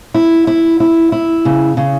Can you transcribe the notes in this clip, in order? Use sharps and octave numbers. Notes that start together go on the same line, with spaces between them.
E4
E4
E4
E4
C#3
C#3